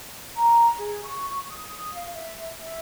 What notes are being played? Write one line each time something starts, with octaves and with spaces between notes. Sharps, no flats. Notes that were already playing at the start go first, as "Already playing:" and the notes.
A#5
G#4
C#6
D#6
F5
E5
E5